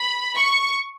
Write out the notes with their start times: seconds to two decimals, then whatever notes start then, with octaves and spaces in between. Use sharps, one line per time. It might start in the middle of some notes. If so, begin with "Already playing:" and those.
Already playing: B5
0.35 C#6